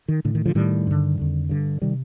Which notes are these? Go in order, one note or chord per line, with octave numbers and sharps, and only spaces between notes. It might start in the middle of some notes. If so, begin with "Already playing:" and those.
D#3
A2 D3
D#3
D3 F3
A2 D#3 G3
G2 D3
F2 D3
G2 D3
C3 D#3 G3